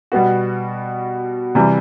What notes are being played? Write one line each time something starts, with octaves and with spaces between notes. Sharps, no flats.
B2 G3 B3 F#4
C3 E3 G3